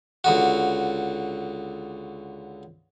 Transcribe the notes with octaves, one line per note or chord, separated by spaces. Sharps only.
C#2 D3 F#4